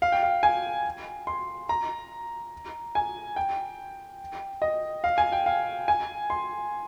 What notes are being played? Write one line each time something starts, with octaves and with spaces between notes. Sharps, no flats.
F5
G5
F5
G#5
C6
A#5
G#5
G5
D#5
F5
G#5
G5
F5
G#5
C6